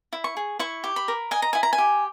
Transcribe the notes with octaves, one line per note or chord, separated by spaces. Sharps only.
E4
C#6
G#4
E4 C#6
G4
B5
A#4
D#5 G#5
A#5
E4 G#5
A#5
G#5
G4